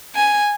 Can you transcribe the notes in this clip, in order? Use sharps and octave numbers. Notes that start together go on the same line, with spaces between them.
G#5